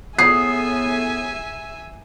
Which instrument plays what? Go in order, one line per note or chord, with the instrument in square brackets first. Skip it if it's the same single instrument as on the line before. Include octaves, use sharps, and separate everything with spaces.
[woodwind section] A2 B3 [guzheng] G#4 [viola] E5 G#5 [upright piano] C7